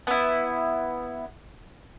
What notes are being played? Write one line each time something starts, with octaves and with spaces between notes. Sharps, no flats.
B3 E4